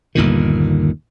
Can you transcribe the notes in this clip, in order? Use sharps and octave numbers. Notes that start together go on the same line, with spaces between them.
G1 D#2 A#2 D#3